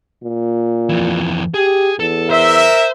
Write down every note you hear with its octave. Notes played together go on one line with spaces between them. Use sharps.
A#2
F2 E3
G4 G#4
E2 A4
A#4 C5 E5